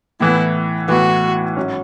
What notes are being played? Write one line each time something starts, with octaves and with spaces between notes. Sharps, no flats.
A2 E3 B3 E4
A2 E3 B3 F#4
G#1 F#3 C#4 F#4